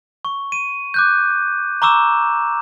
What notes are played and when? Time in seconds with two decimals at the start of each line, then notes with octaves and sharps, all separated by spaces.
0.25 C#6
0.52 D#7
0.94 D6 F#6 G6
1.82 A#5 C#6 D6 E6 E7